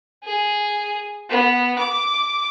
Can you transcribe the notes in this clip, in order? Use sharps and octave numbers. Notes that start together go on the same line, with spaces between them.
G#4
B3
D6